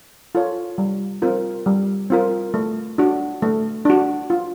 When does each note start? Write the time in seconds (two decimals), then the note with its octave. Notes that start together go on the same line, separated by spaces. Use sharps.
0.35 F4 A4 C#5
0.78 G3
1.22 C4 F4 A#4
1.66 G3
2.10 C4 F4 A#4
2.54 A3
2.98 D4 F#4
3.42 A3
3.85 D4 F#4
4.30 F4